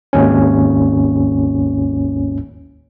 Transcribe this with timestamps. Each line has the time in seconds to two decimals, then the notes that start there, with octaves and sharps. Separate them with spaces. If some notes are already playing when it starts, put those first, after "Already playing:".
0.13 G#1 D#2 C#4